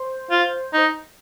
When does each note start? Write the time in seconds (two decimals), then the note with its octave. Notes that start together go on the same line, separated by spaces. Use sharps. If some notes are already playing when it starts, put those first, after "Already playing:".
Already playing: C5
0.31 F4
0.74 D#4